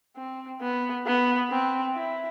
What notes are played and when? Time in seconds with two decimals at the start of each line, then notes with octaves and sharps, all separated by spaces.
0.17 C4
0.61 B3
1.06 B3
1.50 C4
1.95 E4